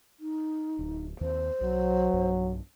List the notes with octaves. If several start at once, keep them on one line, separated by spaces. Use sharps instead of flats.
D#4
D1
D#2 C4 C5
B1 F#3
B1 G2